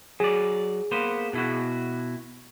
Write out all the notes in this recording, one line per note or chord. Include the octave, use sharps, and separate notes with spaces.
F#3 G#4 D5
A#3 B3 C5
B2 E4 F#4